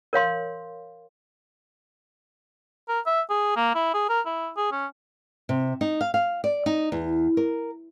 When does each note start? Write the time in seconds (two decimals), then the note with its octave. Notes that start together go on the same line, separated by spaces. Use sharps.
0.13 A#4 C#5 F5 C6
2.89 A#4
3.06 E5
3.30 G#4
3.56 A#3
3.75 E4
3.94 G#4
4.09 A#4
4.26 E4
4.57 G#4
4.72 C#4
5.49 C3
5.81 D#4
6.01 F5
6.14 F5
6.44 D5
6.66 D#4
6.92 E2
7.37 A#4